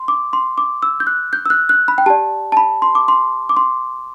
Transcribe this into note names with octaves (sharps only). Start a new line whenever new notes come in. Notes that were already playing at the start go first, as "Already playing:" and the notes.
Already playing: C6
D6
C6
D6
E6
G6
F#6
G6
E6
F#6
F#6
B5
G5
G4 D5 A5
A5
B5
C6
D6
C6
D6
C6